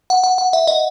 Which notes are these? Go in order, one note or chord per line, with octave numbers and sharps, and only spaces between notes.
F#5
F#5
F#5
E5
D#5